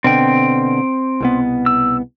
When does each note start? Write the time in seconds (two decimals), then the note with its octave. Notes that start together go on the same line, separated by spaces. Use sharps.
0.04 B2 D3 C4 G5
1.20 C2 B2 B3
1.66 E6